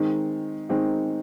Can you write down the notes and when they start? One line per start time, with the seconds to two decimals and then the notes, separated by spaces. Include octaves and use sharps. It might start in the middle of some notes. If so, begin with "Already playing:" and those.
Already playing: D#3 G#3 C4 D#4
0.69 D#3 G#3 C4 D#4